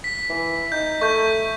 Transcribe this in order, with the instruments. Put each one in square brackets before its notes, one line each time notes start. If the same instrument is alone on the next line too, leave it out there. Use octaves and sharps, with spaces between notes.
[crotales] B6
[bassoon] E3
[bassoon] D#4 [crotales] G6
[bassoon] A3 [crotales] C#6 G6